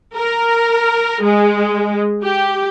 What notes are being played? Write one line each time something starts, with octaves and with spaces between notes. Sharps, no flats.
A#4
G#3
G4